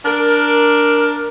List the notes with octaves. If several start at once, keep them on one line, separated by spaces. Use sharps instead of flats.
D4 A#4